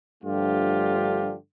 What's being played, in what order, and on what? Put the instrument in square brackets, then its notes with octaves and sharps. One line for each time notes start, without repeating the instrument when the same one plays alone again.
[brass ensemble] G2 D3 F3 A3 F4 G4